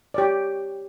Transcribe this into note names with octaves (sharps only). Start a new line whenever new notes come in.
G4 C#5 D5